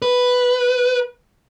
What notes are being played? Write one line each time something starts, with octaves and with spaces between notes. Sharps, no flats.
B4